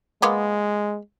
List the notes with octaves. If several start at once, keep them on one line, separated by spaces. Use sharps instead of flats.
G#3 A#3 B3 F4